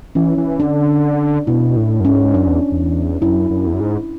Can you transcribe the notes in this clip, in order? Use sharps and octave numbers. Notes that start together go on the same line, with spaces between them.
E3 C#4
E3
D3 D4
B2 E4
A2
F#2
G#2 C#4
F#2 D4
E2
E2
F#2 E4
F#2
E2
F#2
G#2